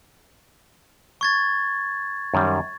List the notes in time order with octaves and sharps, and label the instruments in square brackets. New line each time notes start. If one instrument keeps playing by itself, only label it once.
[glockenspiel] C#6 G#6 A6
[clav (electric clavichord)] F#2 D#3 G3